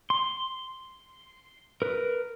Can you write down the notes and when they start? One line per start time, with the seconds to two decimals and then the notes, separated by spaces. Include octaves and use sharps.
0.10 C6
1.82 A#4 B4